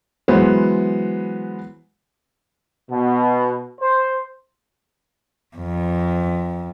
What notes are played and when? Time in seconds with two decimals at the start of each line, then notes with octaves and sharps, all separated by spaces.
0.28 E3 F#3 G#3 B3 C5
2.90 B2
3.80 C5
5.56 F2